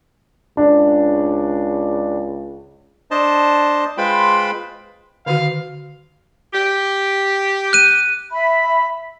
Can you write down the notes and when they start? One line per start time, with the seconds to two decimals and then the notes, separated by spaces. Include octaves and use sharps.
0.57 C#2 D4
3.11 D4 C5 D#5 A5
3.97 G#3 F4 B4 C5 G5 B5
5.26 D3 D#3 F#4 F5
6.53 G4
7.73 F#6 D#7
8.32 E5 B5